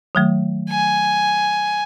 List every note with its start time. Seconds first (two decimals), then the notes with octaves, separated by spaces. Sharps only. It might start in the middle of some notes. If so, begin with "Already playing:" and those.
0.15 D#3 F#3 A3
0.70 G#5